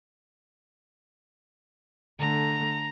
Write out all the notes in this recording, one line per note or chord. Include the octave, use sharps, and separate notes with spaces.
D3 A3 A#5